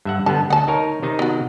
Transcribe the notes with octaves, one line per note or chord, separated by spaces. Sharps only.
G2 E5 F#5
D3 G3 B3 A5
D2 F#5 A5
D#4 A#4 C#5
C3 D#3 D#4
B3 F#4